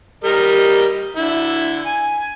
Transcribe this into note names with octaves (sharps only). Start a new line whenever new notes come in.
G3 A#4 D#5
D3 E4
G#5